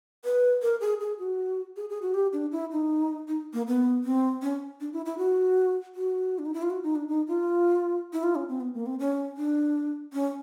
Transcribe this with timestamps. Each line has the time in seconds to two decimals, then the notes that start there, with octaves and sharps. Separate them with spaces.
0.25 B4
0.62 A#4
0.81 G#4
1.00 G#4
1.19 F#4
1.76 G#4
1.89 G#4
2.02 F#4
2.14 G4
2.33 D4
2.52 E4
2.72 D#4
3.28 D#4
3.53 A#3
3.67 B3
4.04 C4
4.42 C#4
4.80 D4
4.93 E4
5.06 E4
5.18 F#4
5.95 F#4
6.39 D4
6.45 D#4
6.54 E4
6.62 F4
6.70 F#4
6.83 D#4
6.95 D4
7.08 D#4
7.28 F4
8.13 E4
8.23 F4
8.35 C#4
8.49 C4
8.60 B3
8.74 A#3
8.86 C4
8.99 C#4
9.37 D4
10.13 C#4